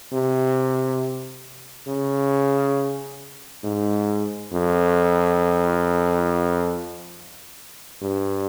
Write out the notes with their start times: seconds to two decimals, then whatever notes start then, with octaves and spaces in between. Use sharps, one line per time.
0.12 C3
1.87 C#3
3.64 G#2
4.52 F2
8.02 G2